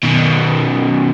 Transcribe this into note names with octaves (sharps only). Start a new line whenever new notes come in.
B2 D#3